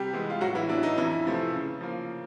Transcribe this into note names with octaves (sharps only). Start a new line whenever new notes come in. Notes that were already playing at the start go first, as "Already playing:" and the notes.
Already playing: C3 G3 G4
E3 G#3 B3
F4
A2 F#3 F#4
E3 E4
F#3 B3 D4
D#4
F2 E3 E4
C3 F3 A3
C#3
F3 A#3